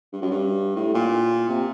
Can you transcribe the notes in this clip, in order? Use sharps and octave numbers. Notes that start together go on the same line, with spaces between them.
G2
F#2
G2
A2
A#2
C3